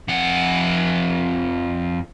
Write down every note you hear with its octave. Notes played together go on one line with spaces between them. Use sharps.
F2 F#5